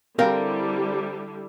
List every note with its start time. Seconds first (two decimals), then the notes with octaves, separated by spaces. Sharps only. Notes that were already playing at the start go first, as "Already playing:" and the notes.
0.19 D3 G3 C4 E4 A#4 F5